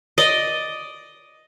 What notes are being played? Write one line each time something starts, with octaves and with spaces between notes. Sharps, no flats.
D5 D#5